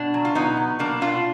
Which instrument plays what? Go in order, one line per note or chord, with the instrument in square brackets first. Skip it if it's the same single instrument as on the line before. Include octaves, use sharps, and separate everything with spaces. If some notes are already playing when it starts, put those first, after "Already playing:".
Already playing: [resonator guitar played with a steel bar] B2 D4
F#3
F4
B2 B3 D#4
F#3
B2 A#3 D4
B2 D4 F4